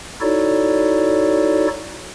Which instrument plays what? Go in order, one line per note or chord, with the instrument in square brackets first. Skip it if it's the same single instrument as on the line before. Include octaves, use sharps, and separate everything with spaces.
[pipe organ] D#4 E4 F#4 A4 C#5 D5